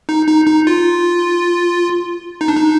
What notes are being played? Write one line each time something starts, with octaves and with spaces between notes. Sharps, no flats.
D#4
D#4
D#4
F4
D#4
D4
D#4